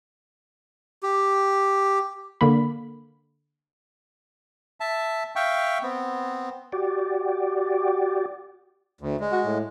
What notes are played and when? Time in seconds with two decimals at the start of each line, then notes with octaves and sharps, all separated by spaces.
1.03 G4
2.41 D3 A#3 B5
4.80 E5 A5
5.36 E5 F5 G5 C#6
5.83 B3 C4
6.72 F#4 G4 D5
9.01 D2
9.20 G#3
9.32 F#4
9.45 A2